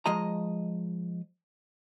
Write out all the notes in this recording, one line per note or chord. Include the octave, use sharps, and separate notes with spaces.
F3 G#3 D#5 A#5